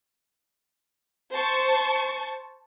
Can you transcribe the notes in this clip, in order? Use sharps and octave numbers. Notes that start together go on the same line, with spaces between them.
C5 A5 C#6